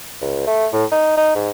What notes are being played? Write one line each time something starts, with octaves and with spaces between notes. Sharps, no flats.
C#2
A3
A2
D#4
D#4
G#2